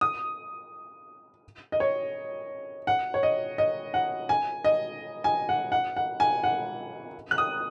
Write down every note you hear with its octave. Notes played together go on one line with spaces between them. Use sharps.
D#6
D#5
C#5
F#5
C#5
D#5
D#5
F#5
G#5
D#5
G#5
F#5
F#5
F#5
G#5
F#5
F#6
D#6